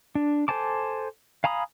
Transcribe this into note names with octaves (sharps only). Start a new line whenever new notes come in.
D4
A4 C5 G#5 A5 D6
F5 G#5 A#5 B5 D#6